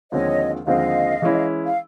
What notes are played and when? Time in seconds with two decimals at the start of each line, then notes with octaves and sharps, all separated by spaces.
0.11 D#2 D3 F3 G#3 C4 C#5 D#5
0.67 D#2 D3 F3 G#3 C4 D#5 F5
1.22 E3 G#3 C#4 E4
1.66 F5